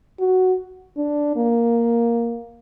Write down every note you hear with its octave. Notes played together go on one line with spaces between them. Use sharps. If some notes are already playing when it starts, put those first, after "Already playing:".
F#4
D4
A#3